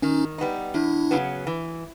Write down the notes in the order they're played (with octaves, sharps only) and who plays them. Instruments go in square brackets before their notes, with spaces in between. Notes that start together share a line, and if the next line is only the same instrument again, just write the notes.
[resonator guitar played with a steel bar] D#3 [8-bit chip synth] C#4 D#4
[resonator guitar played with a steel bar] G3 B3 D#4
[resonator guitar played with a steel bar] E2 [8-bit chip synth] D4 E4
[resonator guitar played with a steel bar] C#3 F#3 B3
E3